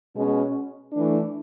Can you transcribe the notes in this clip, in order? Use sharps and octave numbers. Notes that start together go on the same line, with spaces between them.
B2 G#3 C#4
E3 A3 D4